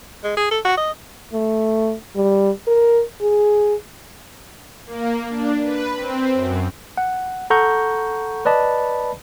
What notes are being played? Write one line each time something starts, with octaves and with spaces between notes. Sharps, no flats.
G#3
G#4
A4
F#4
D#5
A3
G3
A#4
G#4
A#3
D4
B4
C4
F#2
F#5
A4 F#5 A#5 C#6 G6
B4 D5 D#5 A5 B5